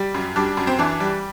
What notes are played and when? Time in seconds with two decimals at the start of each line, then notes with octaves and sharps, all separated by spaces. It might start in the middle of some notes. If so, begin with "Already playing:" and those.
Already playing: G3
0.14 F#2
0.36 G3 D4
0.57 F#2
0.67 C4
0.79 E3 D4
1.00 G3